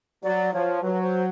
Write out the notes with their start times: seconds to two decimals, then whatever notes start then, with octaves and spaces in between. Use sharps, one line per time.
0.23 F#3 D5
0.53 F3 C#5
0.83 F#3 B4
1.02 C5